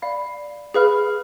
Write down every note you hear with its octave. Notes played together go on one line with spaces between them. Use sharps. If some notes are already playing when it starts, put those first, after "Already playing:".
D5 F5 B5
G#4 B4 F5 B5 F6